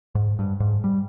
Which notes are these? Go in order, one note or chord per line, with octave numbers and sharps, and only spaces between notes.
G#2
G2
G#2
G3